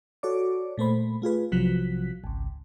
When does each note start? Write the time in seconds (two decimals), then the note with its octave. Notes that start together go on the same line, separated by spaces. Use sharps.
0.23 F#4 A4 C#5 D5 D6
0.77 A#2 A3 C5 B5
1.22 A3 F4 G#4 B4
1.52 B1 C3 F3 F#3 F#6 B6
2.24 G#1 C#2